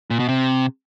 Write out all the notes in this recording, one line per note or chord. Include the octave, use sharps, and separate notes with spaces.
A#2
B2
C3